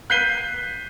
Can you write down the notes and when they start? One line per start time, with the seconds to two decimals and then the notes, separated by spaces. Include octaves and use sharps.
0.10 F#6 G6 B6 C7 D#7 G7